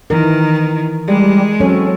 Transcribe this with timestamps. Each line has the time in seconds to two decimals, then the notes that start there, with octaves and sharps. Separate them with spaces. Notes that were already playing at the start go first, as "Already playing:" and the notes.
0.10 D#3 E3 A#4
1.08 G3 G#3
1.60 F#3 C4 C#4 A4